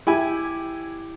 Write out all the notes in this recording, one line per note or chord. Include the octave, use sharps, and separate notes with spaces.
E4 G4 G#5